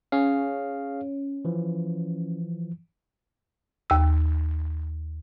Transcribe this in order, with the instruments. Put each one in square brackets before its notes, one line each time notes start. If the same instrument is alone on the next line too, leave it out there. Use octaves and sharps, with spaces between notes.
[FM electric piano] C#4 [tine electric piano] G#4 F5
[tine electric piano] E3 F3
[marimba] D#2 E6